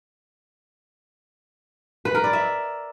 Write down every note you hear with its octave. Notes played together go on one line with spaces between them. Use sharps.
B4
A#4
D5
E5